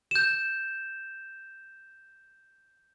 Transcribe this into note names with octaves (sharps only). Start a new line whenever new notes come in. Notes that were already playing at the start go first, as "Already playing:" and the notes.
G6 E7